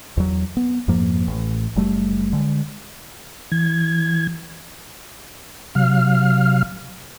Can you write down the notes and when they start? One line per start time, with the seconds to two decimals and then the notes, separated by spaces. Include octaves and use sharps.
0.17 E2 F#3
0.57 B3
0.88 F2 G#2 F3 A#3
1.28 A1
1.76 F#1 G3 A3
2.33 D3 G#3
3.52 E3 G#6
5.75 C3 F#3 F5 F6